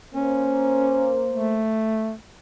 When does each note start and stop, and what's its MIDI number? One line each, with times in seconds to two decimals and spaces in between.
0.14 1.61 58
0.14 1.21 61
0.14 1.61 72
1.32 2.14 57